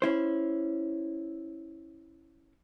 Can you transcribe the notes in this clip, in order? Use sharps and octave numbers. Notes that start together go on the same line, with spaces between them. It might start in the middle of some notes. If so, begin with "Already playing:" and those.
C#4 E4 C5